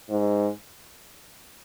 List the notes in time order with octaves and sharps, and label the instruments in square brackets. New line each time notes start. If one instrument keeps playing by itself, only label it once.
[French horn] G#2